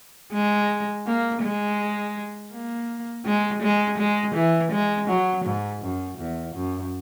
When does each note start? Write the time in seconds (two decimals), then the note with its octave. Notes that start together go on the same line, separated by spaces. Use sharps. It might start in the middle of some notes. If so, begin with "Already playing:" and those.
0.33 G#3
1.06 A#3
1.42 G#3
2.52 A#3
3.25 G#3
3.62 G#3
3.98 G#3
4.35 E3
4.72 G#3
5.08 F#3
5.45 G#2
5.82 F#2
6.18 E2
6.55 F#2